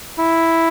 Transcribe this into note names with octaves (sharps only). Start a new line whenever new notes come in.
E4